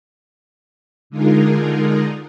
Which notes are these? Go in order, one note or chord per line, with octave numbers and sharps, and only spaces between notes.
D3 G#3 D#4 F4 G#4 A#4